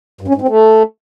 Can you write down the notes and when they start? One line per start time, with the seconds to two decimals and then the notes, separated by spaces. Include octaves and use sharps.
0.21 G2
0.28 C#4
0.35 G#2
0.41 C4
0.48 A3